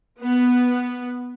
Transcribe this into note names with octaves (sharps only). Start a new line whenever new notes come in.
B3